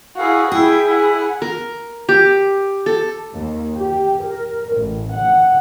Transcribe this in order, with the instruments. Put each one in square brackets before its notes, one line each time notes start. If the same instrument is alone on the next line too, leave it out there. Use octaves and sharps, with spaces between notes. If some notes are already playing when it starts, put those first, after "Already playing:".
[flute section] E4 F5 [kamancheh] F#4 G#4
[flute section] E4 [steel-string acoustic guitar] G#4 [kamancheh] G5
[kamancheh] F#5 G#5
[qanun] A#4
G4
A4
[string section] D#2
G4
A#4
A1
F#5